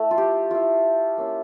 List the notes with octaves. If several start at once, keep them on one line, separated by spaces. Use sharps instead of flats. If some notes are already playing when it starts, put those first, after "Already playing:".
Already playing: A3 E4 A4
F4
G4
A3 E4 F4
A#3 C#4 E4